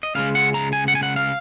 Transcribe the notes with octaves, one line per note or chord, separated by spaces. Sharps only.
D#5
C#2 C#3 G#3 F5
F#5
A#5
G#5
F#5
G#5
F#5
F5